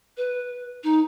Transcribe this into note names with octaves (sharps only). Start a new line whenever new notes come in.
B4
D#4